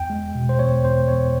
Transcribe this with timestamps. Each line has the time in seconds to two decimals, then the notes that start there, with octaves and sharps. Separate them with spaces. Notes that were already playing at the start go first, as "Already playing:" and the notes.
Already playing: E2 G5
0.10 G#3
0.35 B2
0.49 C5
0.59 E2 C#5
0.85 E2 C5
1.08 E2 C#5